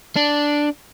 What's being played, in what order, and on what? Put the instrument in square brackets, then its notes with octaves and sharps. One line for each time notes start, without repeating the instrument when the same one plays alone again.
[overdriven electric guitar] D4